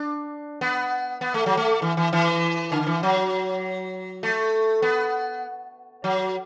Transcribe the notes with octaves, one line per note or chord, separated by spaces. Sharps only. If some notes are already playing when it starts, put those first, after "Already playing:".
Already playing: D4
B3
B3
A3
F#3
A3
E3
E3
E3
D3
E3
F#3
A3
B3
F#3